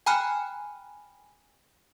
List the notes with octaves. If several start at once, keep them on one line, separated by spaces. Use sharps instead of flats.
G5 G#5 A#5 B5 F6 F#6